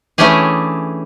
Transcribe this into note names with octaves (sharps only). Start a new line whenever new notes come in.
E3 A3 C#4 D4 G4 G#4